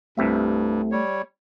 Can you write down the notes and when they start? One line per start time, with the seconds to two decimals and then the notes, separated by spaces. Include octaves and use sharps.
0.17 C2 G2 C3 A3 E5
0.92 G3 C#5